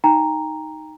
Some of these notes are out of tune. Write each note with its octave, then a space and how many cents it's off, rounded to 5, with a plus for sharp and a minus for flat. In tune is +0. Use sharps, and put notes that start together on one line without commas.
D#4 +0 G5 +30 A#5 +0